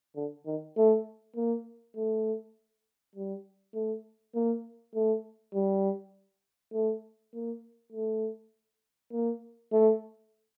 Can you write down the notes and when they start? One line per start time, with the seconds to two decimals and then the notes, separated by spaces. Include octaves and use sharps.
0.16 D3
0.46 D#3
0.77 A3
1.36 A#3
1.96 A3
3.16 G3
3.74 A3
4.35 A#3
4.95 A3
5.54 G3
6.73 A3
7.34 A#3
7.92 A3
9.13 A#3
9.72 A3